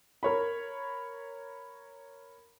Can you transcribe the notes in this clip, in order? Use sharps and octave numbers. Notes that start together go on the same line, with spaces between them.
A#4 C#5 B5